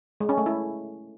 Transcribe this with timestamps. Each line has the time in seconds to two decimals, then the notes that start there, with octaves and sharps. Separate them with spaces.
0.20 G#3
0.29 C#4
0.38 A3
0.46 E4